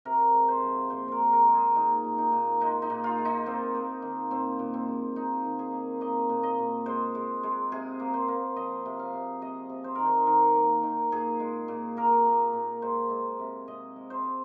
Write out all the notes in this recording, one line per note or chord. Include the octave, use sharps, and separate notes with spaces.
C3 A#4
G#3
C5
F3
A#2 C5
A#4 C5
G#3
A#4
G#3
G#4
A#2 D#4
A#2
D#4
A#2
G#3 D#4
D#4
A#2
F4
G#3
D#4
A#3 C4
A#3
D#3
A#2 C4
A#2
C4
G#3
A#3 D#4
D#3
G#4
A#3
A#3 D#5
A#2
D#5
A#2
G#3 C5
G#3
G#3
C3 G#4
A#3
C5
A#3
F3 D#5
C3
F5
C3
C3 D#5
C3
C5
D#3 A#4
C5
D#3 A#4
A#3
D#3
A#2 G#4
G#3
A#2
A#3 A#4
A#3
A#2
G#3 C5
G#3
C3
C3 D#5
G#3
C5
G#3